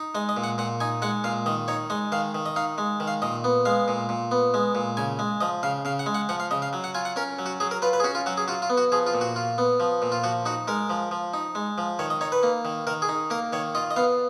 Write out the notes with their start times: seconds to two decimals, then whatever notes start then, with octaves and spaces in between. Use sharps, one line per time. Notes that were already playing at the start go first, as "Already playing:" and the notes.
Already playing: D#4
0.15 G#3 D#5
0.29 D#5
0.37 A#2
0.44 F#5
0.58 A#2 F#5
0.80 D#4 G#5
1.02 G#3 F#5
1.24 A#2 F5
1.46 D#3 D#5
1.68 D#4 C#5
1.90 G#3 D#5
2.12 D#3 F5
2.35 D#3
2.46 D#5
2.56 D#4 F5
2.78 G#3
3.00 D#3
3.07 F5
3.22 A#2 D#5
3.44 B3
3.65 G#3 F5
3.88 A#2
4.09 A#2
4.31 B3
4.54 G#3
4.75 A#2
4.97 C#3 G#5
5.19 G#3
5.41 F3 D#5
5.63 C#3 F5
5.85 C#3 F5
5.99 F#5
6.06 G#3
6.14 F#5
6.29 F3 F#5
6.40 F5
6.51 C#3 D#5
6.62 F5
6.73 F#3
6.84 F#5
6.95 F4 G#5
7.05 F#5
7.16 C#4 A#4
7.39 F#3
7.46 F#4
7.60 F#3 G#4
7.71 A#4
7.82 F4 B4
7.93 B4
8.00 G#4
8.04 C#4 F#4
8.15 F4
8.26 F#3 F#4
8.37 G#4
8.48 F4 F#4
8.62 F4
8.70 B3
8.77 F#4
8.92 F3 G#4
9.07 F4
9.14 A#2
9.21 F#4
9.36 F4
9.58 B3
9.80 F3
10.02 A#2
10.12 F4
10.24 F3 F#4
10.46 D#4 F#4
10.68 G#3 A#4
10.90 F3
11.11 F3
11.34 D#4
11.55 G#3
11.78 F3
11.99 D#3 C#5
12.10 D#5
12.21 D#4 C#5
12.32 B4
12.43 A#3
12.65 D#3
12.87 D#3 A#4
13.02 G#4
13.09 D#4
13.30 A#3 A#4
13.53 D#3 C#5
13.75 F4 D#5
13.91 D#5
13.96 B3 F5